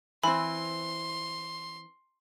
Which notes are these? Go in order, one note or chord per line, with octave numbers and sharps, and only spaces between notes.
E3 C4 B5 C6